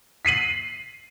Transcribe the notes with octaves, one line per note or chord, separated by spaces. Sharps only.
B6 C7 D#7 F#7